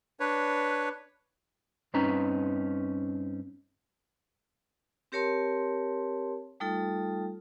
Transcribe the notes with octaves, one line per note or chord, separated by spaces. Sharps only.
D4 B4 C#5
G2 C4 C#4 D#4 B4 A#5
C4 G4 A#4 C#5 A5 C6
G3 A3 D#4 F4 A4